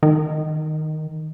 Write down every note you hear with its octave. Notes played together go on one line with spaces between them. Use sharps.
D#3